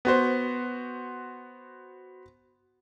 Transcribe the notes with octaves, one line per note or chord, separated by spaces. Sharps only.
B3 F#4 C5